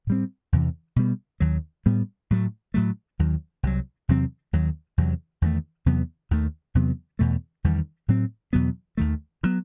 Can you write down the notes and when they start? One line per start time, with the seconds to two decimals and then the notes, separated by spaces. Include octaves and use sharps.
0.07 A2 G3 C4
0.53 E2 C3 E3
0.96 B2 G3 B3
1.40 D#2 D#3 F#3
1.86 A2 G3 B3
2.31 A2 F#3 A3
2.74 A2 F#3 A3
3.19 D#2 D#3 F#3
3.63 C2 C3 F#3
4.09 E2 C3 F#3 C4
4.53 D#2 D#3 F#3
4.98 E2 C3 F#3
5.42 E2 D#3 F#3 A3
5.86 E2 C3 F#3 B3
6.31 D#2 D#3 A3
6.75 E2 C3 F#3 B3
7.19 E2 B2 A3
7.64 E2 D#3 G3
8.08 A2 F#3 C4
8.53 E2 B2 F#3 B3
8.97 D#2 D#3 A3
9.43 B2 F#3 B3